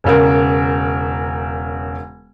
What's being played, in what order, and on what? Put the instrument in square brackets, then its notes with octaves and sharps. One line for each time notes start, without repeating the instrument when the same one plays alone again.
[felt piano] E1 C#3 A#4